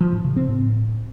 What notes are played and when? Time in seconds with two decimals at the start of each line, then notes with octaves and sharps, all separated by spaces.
0.01 F3
0.12 A2
0.24 C#3
0.36 C4
0.48 A2